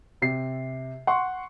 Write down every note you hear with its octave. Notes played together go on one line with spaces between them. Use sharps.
C3 C7
F#5 C6 C#6